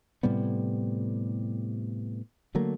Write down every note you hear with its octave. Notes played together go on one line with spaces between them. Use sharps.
A2 C3 G3 B3
D3 F#3 A3 A#3